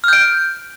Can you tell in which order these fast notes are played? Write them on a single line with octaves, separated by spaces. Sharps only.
F6 G6 D7